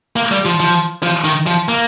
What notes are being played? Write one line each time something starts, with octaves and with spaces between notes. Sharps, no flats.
A#3
G3
F3
F3
F3
D#3
F3
A#3